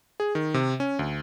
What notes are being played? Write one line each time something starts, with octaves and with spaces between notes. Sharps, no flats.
G#4
D#3
C3
C#4
D2